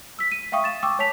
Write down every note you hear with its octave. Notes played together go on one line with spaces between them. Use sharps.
E6 B6
D#7
E5 F5 G5 C#6 D#6
A6 E7
G5 C#6 D6 E6
C#5 G#5 A5 B6 F7